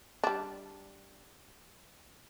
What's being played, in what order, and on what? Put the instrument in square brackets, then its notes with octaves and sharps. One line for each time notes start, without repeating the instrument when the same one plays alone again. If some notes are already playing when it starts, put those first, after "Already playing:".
[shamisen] G3 D4